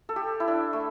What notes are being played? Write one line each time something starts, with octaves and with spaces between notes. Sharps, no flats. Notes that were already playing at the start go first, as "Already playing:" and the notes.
A4
G4
E4
D4
A3